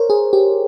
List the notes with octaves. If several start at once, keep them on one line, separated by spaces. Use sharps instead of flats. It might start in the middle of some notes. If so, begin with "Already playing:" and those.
Already playing: A#4 C5 C#5
G#4
G4